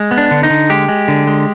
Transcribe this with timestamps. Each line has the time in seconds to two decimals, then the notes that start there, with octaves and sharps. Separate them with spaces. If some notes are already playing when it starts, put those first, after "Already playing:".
Already playing: G#3
0.11 B3
0.18 D4
0.31 D3
0.43 D#4
0.50 D3
0.70 G#3 G4
0.88 G#3
1.08 D3
1.27 G#3